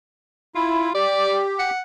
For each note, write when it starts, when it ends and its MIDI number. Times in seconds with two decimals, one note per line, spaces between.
0.55 0.90 64
0.55 0.91 65
0.95 1.70 67
0.95 1.41 74
1.59 1.81 78